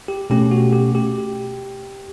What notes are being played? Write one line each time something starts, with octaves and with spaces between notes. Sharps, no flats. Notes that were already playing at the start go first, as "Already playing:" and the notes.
G4
B2 A3 C#4 G4
F#4
G4
G4